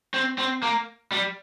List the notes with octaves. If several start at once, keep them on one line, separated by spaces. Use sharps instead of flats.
C4
C4
A#3
G3